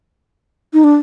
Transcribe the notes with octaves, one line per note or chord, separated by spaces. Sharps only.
D#4
D4